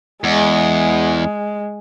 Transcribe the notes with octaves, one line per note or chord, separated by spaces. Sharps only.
E2 G#3